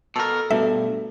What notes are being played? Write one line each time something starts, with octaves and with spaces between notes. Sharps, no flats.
B2 A4 A#4
G2 B2 A3 E5